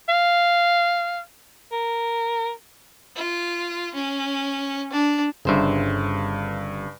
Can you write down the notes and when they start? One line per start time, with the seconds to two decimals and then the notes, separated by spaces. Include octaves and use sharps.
0.09 F5
1.72 A#4
3.16 F4
3.94 C#4
4.92 D4
5.45 G1 G2 C#3 C5 E5